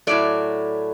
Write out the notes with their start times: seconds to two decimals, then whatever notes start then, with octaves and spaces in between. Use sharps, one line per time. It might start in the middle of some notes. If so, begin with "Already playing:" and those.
0.07 A2 F#3 A3 D5